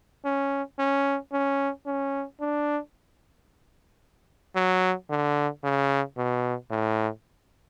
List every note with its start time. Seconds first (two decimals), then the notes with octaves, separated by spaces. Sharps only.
0.25 C#4
0.79 C#4
1.32 C#4
1.86 C#4
2.41 D4
4.55 F#3
5.10 D3
5.64 C#3
6.17 B2
6.71 A2